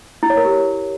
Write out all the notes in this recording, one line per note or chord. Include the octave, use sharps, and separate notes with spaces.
E4
C#5
A#4
G4